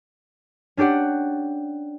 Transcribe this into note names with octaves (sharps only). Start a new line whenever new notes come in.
C#4 D4 G4 D5 F#5